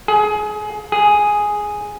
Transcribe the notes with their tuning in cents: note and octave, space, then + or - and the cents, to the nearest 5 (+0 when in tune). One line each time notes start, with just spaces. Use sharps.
G#4 +25
G#4 +0